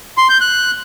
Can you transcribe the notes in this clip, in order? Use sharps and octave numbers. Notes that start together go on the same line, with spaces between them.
C6
G6
F#6